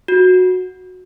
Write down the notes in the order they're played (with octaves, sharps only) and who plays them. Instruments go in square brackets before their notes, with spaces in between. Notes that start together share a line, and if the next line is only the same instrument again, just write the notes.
[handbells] F#4